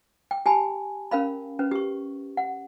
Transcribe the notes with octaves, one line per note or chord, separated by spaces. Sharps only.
G5
G4 G#5 A5 B5
C#4 A#4 F5 B5
C#4 B4
G4 C#6
F#5